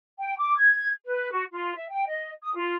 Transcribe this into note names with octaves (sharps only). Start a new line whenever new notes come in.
G5
D6
G#6
B4
F#4
F4
E5
G5
D#5
D#6
F4